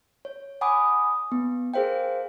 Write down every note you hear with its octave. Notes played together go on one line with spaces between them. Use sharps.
C#5
F#5 G#5 B5 D6 D#6
B3
G#4 A#4 C5 F5 G5